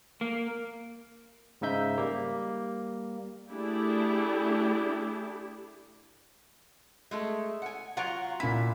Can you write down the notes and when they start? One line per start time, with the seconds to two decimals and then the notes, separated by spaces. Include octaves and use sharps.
0.21 A#3
1.61 G#2 C#3 D#4 E5 G6
1.98 G3 A#3
3.51 A3 D4 E4 G4 G#4
7.11 G#3 A3 A4
7.62 F#5 G#5
7.97 F#3 F4 F#5 A#5 C#6
8.40 A#2 E4 B6